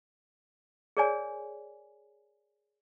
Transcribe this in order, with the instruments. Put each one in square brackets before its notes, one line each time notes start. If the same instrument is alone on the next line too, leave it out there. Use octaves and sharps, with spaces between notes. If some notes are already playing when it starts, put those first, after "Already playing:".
[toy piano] G#4 A#4 C#5 D5 G#5